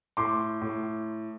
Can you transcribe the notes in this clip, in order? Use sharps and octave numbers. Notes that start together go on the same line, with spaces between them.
A2 C6 D6
A2